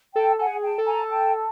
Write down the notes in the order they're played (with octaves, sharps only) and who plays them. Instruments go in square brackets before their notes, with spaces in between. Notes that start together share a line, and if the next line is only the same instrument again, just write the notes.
[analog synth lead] A4 [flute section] G5 A5
[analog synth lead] A4 [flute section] F#5 G#5
[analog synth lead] G#4
[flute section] G5 A5
[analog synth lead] A4
[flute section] G#5 A#5
G5 A5